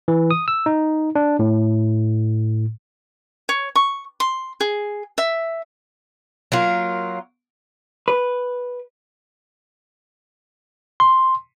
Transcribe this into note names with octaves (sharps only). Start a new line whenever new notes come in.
E3
D#6
E6
D#4
D4
A2
C#5
C#6
C6
G#4
E5
F#3 A#3 F4
B4
C6